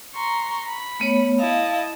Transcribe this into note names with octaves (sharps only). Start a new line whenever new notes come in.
A#5 C6 C#6
B5
A3 B3 C#5
E4 D#5 F5 A5